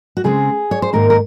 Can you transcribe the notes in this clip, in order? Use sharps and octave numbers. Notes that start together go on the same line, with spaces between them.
F#4
C#3 G#3 C4 G#4
C#5
C5
G#2 D#3 A#3 A#4
A#4